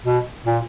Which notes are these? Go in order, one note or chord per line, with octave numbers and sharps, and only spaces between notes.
B2
A#2